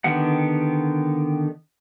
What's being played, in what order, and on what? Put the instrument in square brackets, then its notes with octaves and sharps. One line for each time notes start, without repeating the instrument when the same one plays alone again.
[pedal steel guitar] D3 D#3 B3 G4 F#5